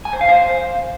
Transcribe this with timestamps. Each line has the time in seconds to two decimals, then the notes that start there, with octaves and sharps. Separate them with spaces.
0.05 G#5
0.13 C5
0.21 F5
0.29 C5